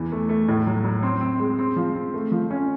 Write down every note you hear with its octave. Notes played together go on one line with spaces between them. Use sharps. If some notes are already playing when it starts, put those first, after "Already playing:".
Already playing: E2 E3
A3
A3
A2
F#3
F#3
C4
C4
G#3
C4
F3
C4
A3
F3
C#4